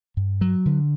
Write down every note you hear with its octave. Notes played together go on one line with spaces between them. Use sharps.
G2
F#3
D3